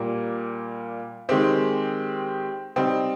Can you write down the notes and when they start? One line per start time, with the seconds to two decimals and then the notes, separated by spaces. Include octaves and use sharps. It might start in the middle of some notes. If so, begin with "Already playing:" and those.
Already playing: A#2 G3 A#3
1.29 D#3 G#3 C4 G4
2.76 G3 C4 D#4